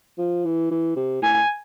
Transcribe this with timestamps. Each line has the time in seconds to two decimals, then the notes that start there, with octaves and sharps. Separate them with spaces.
0.18 F3
0.45 E3
0.71 E3
0.96 C3
1.22 A2 G#5